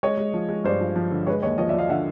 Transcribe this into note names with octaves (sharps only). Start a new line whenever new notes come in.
G#3 C#5 D#5
G#3
F3
G#3
G2 C5 D5
F3
F3
D3
G#3 B4 C#5
D#2 C#5 D#5
F3 C#5 D#5
D5 E5
F3 D#5 F5
D3 E5 F#5